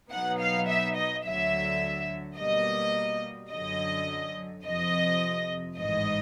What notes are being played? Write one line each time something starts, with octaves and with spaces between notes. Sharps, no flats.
B2 F#3 B3 D#4 F#5
F5
E5
D#5
D2 D3 F#3 E5
B2 G3 A#3 D#5
F#2 D3 F#3 D#5
F2 C3 F3 D#5
A1 G#2 E3 D#5